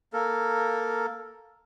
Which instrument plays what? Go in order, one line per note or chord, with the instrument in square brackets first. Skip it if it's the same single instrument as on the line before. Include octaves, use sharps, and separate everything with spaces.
[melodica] A#3 A4 A#4